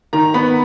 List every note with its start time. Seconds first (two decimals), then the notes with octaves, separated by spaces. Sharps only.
0.13 D#3 A#5
0.34 B3 B5